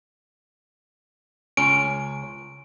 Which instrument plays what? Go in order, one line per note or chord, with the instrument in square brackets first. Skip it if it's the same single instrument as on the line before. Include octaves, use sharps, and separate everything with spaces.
[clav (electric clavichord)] C#2 C#4 [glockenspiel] D7